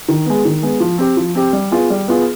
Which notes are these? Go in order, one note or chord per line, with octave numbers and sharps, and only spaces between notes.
D#3
G#3 B3
D#3
G#3 B3
F3
C4 G4
F3
C4 G4
G3
B3 F4 G#4
G3
B3 F4 G#4